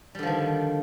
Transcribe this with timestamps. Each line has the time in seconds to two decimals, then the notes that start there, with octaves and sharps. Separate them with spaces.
0.15 G3
0.19 D3
0.23 F3
0.27 D#3